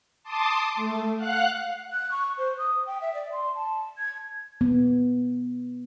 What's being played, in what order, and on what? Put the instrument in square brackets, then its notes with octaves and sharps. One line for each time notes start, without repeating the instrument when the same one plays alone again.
[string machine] A5 C6 D6 D#6
A3
F5 F#5 F#6
[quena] F#6
C#6
C5
D#6
G5
E5
D5
C6
A5
G#6
[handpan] B3